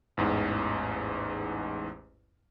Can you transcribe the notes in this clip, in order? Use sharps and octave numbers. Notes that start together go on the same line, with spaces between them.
A1 E2 G#2